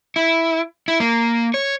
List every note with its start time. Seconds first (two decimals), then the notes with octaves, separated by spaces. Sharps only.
0.16 E4
0.88 E4
1.00 A#3
1.54 C#5